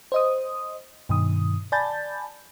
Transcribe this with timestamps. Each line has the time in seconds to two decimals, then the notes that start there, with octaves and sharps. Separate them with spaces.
0.12 C5 D#5 D#6
1.09 G2 B2 D#3 D#6
1.72 D5 G#5 A5 B5 G6 A6